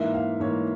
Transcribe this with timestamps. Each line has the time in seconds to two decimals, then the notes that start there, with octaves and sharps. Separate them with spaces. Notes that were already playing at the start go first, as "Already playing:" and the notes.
Already playing: G#2 E3 A#3 E5
0.14 F5
0.40 G#2 E3 A#3 C#5